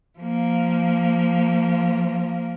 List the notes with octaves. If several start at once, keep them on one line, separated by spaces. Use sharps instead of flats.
F3 A#3